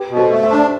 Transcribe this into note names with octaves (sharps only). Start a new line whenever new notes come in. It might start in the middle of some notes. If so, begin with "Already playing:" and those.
Already playing: G4 B4
B2
A4 C5
A3
C5 E5
D4